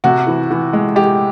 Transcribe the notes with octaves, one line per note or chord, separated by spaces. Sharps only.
C3 F#4
E3
E3
G#3
G#3 G4